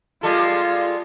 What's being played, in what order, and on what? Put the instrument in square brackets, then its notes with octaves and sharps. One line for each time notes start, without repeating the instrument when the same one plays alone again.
[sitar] G3 G#3 A4 [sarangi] F4